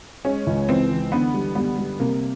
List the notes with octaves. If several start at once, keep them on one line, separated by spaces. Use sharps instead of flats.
G#3 C#4
C#2
E3 C4
E3
D3 B3
G3
G3 B3
G3
C3 A#3